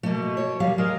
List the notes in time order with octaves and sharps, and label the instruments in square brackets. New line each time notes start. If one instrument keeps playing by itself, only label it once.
[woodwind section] B2 [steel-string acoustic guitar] A3 A#3
[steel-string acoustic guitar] C#5
D#2 G3 F5
[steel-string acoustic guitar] G#3 [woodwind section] A#4 D#5 F5